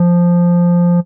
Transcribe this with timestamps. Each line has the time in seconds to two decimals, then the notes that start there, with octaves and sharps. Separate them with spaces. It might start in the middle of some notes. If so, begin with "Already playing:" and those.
Already playing: F3